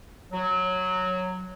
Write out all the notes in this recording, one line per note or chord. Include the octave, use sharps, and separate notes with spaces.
F#3